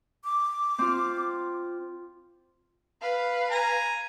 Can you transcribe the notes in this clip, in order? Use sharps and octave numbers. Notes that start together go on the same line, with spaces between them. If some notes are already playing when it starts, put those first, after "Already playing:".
D6
C4 F4
B4 F5
G#5 A#5